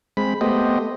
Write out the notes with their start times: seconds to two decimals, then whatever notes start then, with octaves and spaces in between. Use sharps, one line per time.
0.17 G#3 C4 B5
0.41 A3 B3 G4 C5 D#5